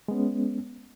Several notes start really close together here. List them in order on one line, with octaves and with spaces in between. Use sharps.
G#3 B3 C#4